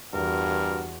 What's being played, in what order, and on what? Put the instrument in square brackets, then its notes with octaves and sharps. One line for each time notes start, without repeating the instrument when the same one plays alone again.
[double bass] E2 [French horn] G2 [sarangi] F#4 [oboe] A#4